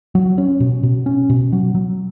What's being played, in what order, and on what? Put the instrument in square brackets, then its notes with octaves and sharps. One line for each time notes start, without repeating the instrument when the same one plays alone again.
[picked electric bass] F#3
C#4
B2
B2
C#4
B2
F#3
F#3